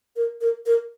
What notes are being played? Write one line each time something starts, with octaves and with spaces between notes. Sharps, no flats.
A#4
A#4
A#4